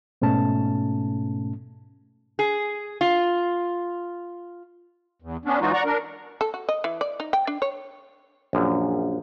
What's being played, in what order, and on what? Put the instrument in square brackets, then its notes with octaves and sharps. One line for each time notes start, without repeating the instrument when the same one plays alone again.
[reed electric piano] G#2 B2 A3 C#4 A5
[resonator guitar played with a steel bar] G#4
F4
[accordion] E2
B3 C#4 D4
E3 F#3 G#3 D#4 F4 F#4
D5 F#5 A#5 C#6
D4 A#4
[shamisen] A4
F#4
D#5
E3
D5
D#4
G5
D4
C#5
[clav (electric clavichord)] A#1 F#2